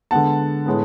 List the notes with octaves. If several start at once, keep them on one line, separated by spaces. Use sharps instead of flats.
D3 G#3 B3 F#5 A5
A2 G#3 B3